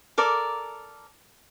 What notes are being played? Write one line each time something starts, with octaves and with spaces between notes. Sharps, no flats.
A4 A#4 D5